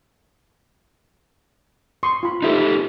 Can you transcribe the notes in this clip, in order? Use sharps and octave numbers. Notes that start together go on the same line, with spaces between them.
C6 C#6 D#6
F4 B5
D#4 G4 A4 D#5 E5 B5